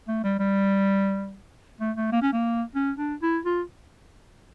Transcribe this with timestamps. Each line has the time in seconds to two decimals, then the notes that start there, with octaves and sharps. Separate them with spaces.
0.08 A3
0.24 G3
0.39 G3
1.81 A3
1.97 A3
2.12 A#3
2.22 C#4
2.33 A#3
2.75 C#4
2.98 D4
3.22 E4
3.45 F4